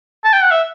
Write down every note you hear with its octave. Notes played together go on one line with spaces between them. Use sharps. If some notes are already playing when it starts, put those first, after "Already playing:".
A5
G5
F#5
E5